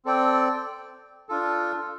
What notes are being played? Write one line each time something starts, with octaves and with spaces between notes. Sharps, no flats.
C4 A4 D5 G5
D4 F4 A4